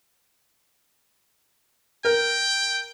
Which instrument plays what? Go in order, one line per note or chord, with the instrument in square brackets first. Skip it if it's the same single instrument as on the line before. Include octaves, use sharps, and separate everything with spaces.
[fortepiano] A#4 [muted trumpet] G5